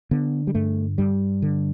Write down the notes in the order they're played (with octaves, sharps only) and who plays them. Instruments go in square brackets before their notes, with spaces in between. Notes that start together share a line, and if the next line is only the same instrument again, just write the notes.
[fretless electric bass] D3 B3
G3
G2 A3
G2 G3
D3